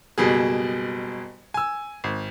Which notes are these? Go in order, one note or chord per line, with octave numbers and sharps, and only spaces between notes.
F#1 B2 G3 G#4
G#5 E6
G#1